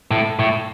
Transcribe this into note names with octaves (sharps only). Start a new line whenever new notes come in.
A2
A2